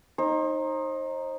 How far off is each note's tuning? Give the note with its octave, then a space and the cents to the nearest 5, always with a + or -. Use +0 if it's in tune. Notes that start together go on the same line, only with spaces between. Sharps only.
D#4 +0 C5 +35